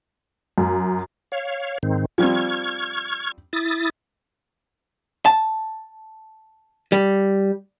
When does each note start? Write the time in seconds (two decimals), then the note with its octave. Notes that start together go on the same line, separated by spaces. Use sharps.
0.58 F#2
1.32 C#5 F5
1.83 G#2 D#3 C4
2.18 F3 G3 C4 C#6 F6 G#6
3.53 E4 D#6 A6
5.26 A5
6.92 G3